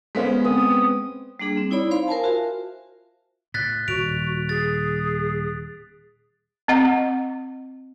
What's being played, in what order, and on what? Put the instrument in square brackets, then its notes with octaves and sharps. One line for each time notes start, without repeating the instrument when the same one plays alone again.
[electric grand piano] G#3 B3 C#4 [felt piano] C5 B6
[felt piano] C4 B4 [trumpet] D#6
[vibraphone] G3 A#3 D4 G#4
C4
D#4 E4 C#5 D5 B5
C5 F5 B5 C6
A#4 C5 G#5 A5
F4 F#4 E5 F5
[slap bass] A2 [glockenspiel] F#6 A6 B6
[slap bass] D#1 [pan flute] F#4 [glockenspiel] D7 F7
[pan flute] G#4 [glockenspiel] A6
[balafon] C4 D#5 F#5 A#5